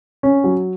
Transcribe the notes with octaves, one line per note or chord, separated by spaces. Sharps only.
C#4
F#3